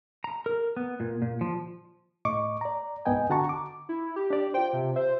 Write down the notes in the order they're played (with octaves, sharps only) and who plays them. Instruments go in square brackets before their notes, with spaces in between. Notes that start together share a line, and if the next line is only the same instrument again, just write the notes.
[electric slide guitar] A#5
A#4
B3
A#2
A#2
F3
[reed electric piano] A2 D#5 C#6 D6
D5 A#5
C2 G#2 B3 D#5 G5 G#5
D3 F#4 F#5 A5 A#5 C#6
D6
[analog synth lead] E4
G4
[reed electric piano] D4 D5
[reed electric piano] F4 C5 [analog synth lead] G5
[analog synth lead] C3
[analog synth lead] C5 [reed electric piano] E5